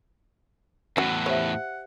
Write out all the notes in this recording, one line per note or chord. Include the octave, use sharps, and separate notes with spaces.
E2 A2 C#4 F#4 F#5
G4 C5 C#5 E5